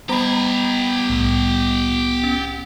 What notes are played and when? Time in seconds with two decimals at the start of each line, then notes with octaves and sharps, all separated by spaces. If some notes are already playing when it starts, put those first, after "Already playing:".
0.09 G3 B3 G4 D#5 G#5 A#5 B5
1.10 C2 A2
2.24 C#4